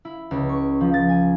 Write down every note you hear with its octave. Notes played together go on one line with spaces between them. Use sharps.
E4
C#2
C#6
F3
A6
G#5